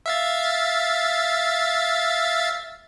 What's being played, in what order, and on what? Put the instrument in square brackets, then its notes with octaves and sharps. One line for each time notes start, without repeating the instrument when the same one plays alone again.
[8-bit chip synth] E5 F5 A6